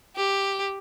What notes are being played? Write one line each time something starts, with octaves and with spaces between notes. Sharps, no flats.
G4